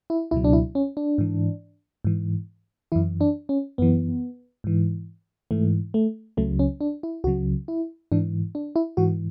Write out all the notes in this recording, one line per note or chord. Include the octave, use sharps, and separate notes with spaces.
E4
C#2 B2 F#3 E4
D4
E4
C#4
D4
G#2 E3
G#2 E3
F#2 E3 E4
D4
C#4
F#2 E3 B3
G#2 E3
G#2 E3 A3
A3
C#2 C#3 F#3 A3
C#4
D4
E4
C#2 C#3 F#3 F#4
E4
G#2 E3 D4
D4
E4
G#2 E3 F#4